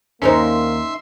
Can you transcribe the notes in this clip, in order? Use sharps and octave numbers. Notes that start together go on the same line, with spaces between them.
D#2 A#3 C#4 D#4 A#4 C5 E5 C6